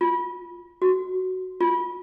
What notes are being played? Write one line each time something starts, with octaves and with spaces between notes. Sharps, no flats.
F4
F#4
F4